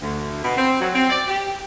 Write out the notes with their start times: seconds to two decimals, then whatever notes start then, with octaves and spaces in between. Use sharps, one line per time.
0.01 D2
0.43 B2
0.57 C4
0.81 F#3
0.94 C4
1.09 D5
1.27 G4